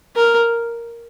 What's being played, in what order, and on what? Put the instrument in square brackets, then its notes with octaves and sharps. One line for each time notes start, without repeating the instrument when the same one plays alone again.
[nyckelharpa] A#4